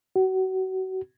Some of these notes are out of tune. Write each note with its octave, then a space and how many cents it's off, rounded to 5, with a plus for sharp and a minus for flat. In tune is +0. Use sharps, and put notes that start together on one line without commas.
F#4 +30